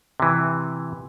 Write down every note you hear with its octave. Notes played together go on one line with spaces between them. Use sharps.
C3 E3